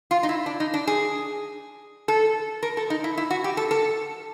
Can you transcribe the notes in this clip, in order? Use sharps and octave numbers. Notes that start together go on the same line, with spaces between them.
F4
D#4
E4
D4
D#4
D4
G#4
A4
A#4
A4
D#4
E4
E4
F#4
G4
A4
A4